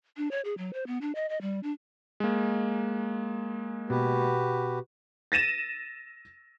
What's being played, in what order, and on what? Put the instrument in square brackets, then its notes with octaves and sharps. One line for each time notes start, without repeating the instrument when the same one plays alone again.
[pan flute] D4
C#5
G#4
F#3
C5
B3
D4
D#5
D#5
G3
D4
[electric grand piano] G#3 A#3
[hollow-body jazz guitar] B2 [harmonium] F#4 G4 B4
[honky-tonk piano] A6 A#6 D#7 E7